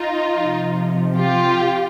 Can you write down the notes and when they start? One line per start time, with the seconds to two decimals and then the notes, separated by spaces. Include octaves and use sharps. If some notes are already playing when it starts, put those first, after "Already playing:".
Already playing: D#4 F4
0.35 F3
0.40 C3
1.16 F4 G4